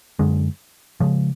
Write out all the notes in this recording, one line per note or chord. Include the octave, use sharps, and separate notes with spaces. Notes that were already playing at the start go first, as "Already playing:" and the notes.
F#2 D3 G#3
C#3 F3 G#3